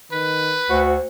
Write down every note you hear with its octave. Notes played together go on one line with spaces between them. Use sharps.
D#3 B4
D2 F#4 C5